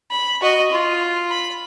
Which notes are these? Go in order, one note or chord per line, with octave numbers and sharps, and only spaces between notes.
B5
F#4 D#5
F4
B5